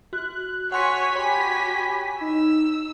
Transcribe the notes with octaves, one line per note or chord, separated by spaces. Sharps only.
F#4 F#6
F#4 C#5 F#5 G#5 C6 B6 C#7
G4 C#5 B5
D#4 E6